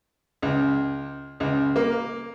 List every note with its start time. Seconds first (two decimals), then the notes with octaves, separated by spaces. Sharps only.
0.42 C#2
1.40 C#2
1.76 A#3